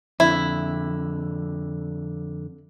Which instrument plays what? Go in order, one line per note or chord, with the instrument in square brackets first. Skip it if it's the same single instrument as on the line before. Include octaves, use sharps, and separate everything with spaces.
[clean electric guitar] F2 D3 [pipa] E4